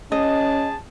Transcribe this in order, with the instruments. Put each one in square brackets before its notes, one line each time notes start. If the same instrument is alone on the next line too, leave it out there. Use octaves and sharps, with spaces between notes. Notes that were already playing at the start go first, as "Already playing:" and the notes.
[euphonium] C#4 [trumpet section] G#4 A5 [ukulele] D#5